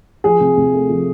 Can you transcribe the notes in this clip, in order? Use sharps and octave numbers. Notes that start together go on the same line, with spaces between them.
F3 G#4
C3
C3
A3
F3